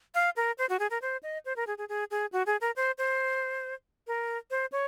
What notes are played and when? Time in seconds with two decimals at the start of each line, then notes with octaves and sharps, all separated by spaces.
0.15 F5
0.36 A#4
0.58 C5
0.69 F#4
0.79 G#4
0.91 A#4
1.02 C5
1.23 D#5
1.45 C5
1.56 A#4
1.67 G#4
1.78 G#4
1.89 G#4
2.11 G#4
2.33 F#4
2.46 G#4
2.61 A#4
2.76 C5
2.98 C5
4.07 A#4
4.51 C5
4.72 C#5